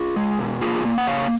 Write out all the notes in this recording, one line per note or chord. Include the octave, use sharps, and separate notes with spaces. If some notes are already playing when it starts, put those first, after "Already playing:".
Already playing: F4 G#4
G#3
B2
A#3 F4 G#4
A#3
F#5
C#3 C#5 F5